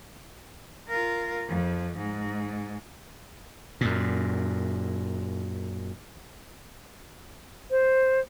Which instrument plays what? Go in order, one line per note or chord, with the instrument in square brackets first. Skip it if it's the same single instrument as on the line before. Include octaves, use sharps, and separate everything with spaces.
[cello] F4 A#4
F2 F3
G#2
[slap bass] F#2 A#2
[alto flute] C5